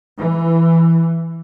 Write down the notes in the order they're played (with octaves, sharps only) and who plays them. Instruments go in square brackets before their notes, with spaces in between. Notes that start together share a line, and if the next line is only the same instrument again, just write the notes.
[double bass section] E3